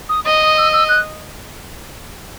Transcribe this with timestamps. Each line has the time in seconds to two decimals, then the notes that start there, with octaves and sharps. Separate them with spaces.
0.09 D#6
0.25 D#5 D#6
0.42 D#6
0.57 E6
0.73 E6
0.89 F#6